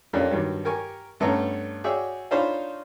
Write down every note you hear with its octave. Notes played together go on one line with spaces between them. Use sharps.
F2 A#3 C#4 D4 G4 A4
G2 D#3 F#3 G3
G4 A#4 G#5 C#6
G2 A3 B3 C#4 A4 A#5
F#4 G#4 C#5 D5 E5 G5
D4 D#4 F4 C5 C#5 B5